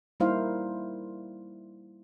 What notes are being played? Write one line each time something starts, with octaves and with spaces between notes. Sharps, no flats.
G3 A#3 D#4 E4 C5 F5